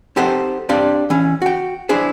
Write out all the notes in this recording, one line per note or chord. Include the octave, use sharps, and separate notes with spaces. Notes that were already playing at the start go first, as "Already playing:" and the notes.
C4 D#4 G4 A4 C5 F#5
C4 D4 G4 D5 F5
E3 C#4
F#4 G5
D4 E4 G#4 C5